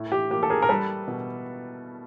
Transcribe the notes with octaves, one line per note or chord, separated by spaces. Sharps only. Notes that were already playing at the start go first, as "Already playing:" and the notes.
Already playing: A2
G4
A#3 G4
A4
G#4 A#4
A#4
G3 A4 B4
B2